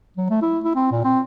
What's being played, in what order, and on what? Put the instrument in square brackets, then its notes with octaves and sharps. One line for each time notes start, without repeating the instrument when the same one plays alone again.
[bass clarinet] F#3
A3
E4
E4
C4
A#2
C4